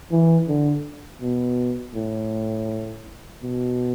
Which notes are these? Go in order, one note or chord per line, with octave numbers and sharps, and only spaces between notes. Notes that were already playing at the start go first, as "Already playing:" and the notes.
E3
D3
B2
A2
B2